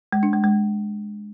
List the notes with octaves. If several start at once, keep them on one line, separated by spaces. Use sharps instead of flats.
G#3
D4
G#3
G#3